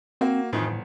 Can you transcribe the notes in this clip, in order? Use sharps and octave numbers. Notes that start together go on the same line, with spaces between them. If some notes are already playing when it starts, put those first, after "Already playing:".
A#3 C4 F#4
F2 A2 D#3 E3
G1